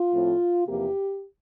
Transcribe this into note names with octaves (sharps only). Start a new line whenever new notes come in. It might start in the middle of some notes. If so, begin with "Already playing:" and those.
Already playing: F4
A2 F3 C4
E2 C3 F3 A#3 G4